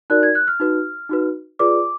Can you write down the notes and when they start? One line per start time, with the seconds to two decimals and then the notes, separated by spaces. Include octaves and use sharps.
0.10 D#4 F#4 A#4 D5 F#6
0.23 G#6
0.35 F#6
0.48 F6
0.60 D#4 F#4 B4
1.09 D#4 F#4 B4
1.59 F4 G#4 B4 D5 D6